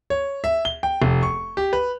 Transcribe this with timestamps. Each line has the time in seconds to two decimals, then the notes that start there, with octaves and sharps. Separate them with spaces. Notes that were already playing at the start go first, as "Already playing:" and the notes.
0.10 C#5
0.44 E5
0.65 G7
0.83 G5
1.02 F1
1.23 C#6
1.57 G4
1.73 B4